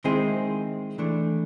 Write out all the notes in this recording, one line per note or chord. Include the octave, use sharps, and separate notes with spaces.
D#3 G#3 C4 E4 G#4
E3 A3 D4